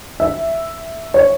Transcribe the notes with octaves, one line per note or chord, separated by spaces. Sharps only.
E5
C#5